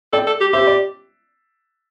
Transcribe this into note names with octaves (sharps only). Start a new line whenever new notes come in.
A4 D5 G5
A4
G4
G4 C5 E5
D5